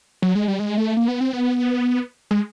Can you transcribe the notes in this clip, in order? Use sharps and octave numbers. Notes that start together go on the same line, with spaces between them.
F#3
G#3
G3
G#3
A3
A#3
B3
C4
B3
G#3